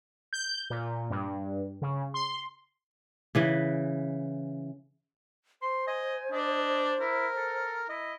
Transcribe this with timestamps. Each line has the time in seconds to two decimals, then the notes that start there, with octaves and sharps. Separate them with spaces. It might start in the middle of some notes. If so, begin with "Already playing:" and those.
0.33 G6
0.70 A#2
1.10 G2
1.82 C#3
2.14 C6
3.35 C#3 E3 B4
5.62 C5 C6
5.87 D#5 G#5
6.32 D4 D#5
7.00 E4 A#4
7.36 A4
7.89 E4 D#5